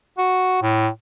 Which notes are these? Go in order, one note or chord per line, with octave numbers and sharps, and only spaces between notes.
F#4
A2